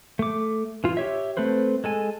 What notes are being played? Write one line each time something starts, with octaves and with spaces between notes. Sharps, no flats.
A3 D6
E3 F4
G4 C#5 E5
A3 C4 B4 C5
G#3 A4 G#5